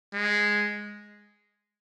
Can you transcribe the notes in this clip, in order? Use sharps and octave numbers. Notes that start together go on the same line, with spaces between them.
G#3